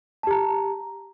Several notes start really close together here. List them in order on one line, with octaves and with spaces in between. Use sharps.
A5 G4 A#5